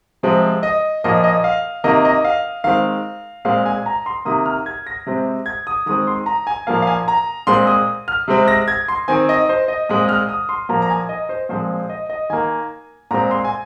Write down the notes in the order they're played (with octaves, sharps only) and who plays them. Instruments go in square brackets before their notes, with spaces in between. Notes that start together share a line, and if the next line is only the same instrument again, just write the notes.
[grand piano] C3 F3 G#3 C4
D#5
A#2 F3 A#3 D#5
D#5
F5
C3 D#3 A#3 D#5
D#5
F5
D#3 G#3 C4 F5
A#2 G#3 C4 F5
G#5
A#5
C6
C3 D#3 A#3 D#6
F6
G#6
A#6
C3 G#3 C4
G#6
D#6
D#3 G#3 C4 D#6
C6
A#5
G#5
A#2 F3 A#3 F5
F5
G#5
A#5
A#2 G#3 C4 C6
D#6
F6
C3 G#3 C4
A#6
G#6
C6
D#3 C4 G#5
D#5
C5
D#5
A#2 G#3 C4 D#6
D#6
F6
D#6
C6
A#2 F3 A#3 A#5
A#5
G#5
D#5
C5
A#2 F3 G#3 C4 C5
D#5
D#5
D#3 A#3 G#5
A#2 G#3 C4 A#5
C6
G#5